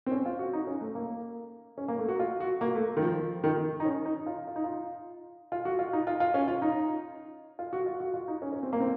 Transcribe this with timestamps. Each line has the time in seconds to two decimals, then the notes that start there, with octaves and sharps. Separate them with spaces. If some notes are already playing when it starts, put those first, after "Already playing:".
0.06 C4
0.11 C#4
0.26 F4
0.39 F#4
0.53 D#4
0.67 C#4
0.81 A3
0.95 A#3
1.78 C#4
1.88 A#3
1.98 A3
2.09 F#4
2.20 F4
2.40 F#4
2.61 A#3
2.75 A3
2.97 D#3
3.02 F3
3.44 D#3
3.58 D#3
3.80 D#4
3.85 C#4
4.06 D#4
4.26 F4
4.47 F4
4.56 D#4
4.64 F4
5.52 F4
5.65 F#4
5.79 F4
5.93 D#4
6.07 F4
6.20 F4
6.34 C#4
6.48 F4
6.62 D#4
7.59 F4
7.73 F#4
7.86 F4
8.00 F#4
8.14 F4
8.28 D#4
8.42 C#4
8.52 C#4
8.63 C4
8.73 A#3
8.80 C4